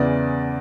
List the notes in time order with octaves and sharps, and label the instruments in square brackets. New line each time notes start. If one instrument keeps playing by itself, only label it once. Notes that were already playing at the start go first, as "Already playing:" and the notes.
Already playing: [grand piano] E2 C#3 E3 D5